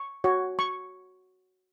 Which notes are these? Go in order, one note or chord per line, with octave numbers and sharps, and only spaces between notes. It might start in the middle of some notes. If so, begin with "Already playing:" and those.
Already playing: C#6
F#4 C#5
C#6